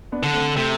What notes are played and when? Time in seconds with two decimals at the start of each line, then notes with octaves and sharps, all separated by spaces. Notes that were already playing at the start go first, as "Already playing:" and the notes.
0.12 B3 D4
0.23 D3
0.34 A3 C4
0.57 C3 A3